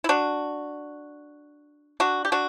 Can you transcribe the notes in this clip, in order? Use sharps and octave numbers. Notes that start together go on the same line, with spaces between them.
E4
D4 F#4
D4 F#4
G4
D4 F#4